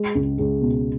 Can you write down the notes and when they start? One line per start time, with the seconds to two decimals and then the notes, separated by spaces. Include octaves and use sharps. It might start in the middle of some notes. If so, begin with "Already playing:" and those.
Already playing: G#3
0.15 C#2
0.39 C#2
0.61 B2